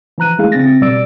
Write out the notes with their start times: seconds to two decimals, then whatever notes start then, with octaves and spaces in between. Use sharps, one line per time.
0.18 E3 F3 A#5 F#6 D#7
0.39 G#3 A3 E4 G#4 F5
0.52 C#3 C4 D4 A6 A#6
0.81 B2 G3 D5 E6 A6 D7